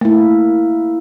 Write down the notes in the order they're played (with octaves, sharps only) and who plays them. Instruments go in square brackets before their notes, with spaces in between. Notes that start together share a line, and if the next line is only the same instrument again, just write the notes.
[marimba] A3 [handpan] A#3 E4